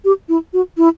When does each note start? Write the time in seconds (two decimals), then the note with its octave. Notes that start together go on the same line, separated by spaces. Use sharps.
0.05 G4
0.29 E4
0.53 F#4
0.77 E4